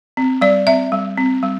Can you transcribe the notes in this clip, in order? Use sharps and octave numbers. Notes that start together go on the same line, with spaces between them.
C4
G3 D5
C4 E5
G3
C4
G3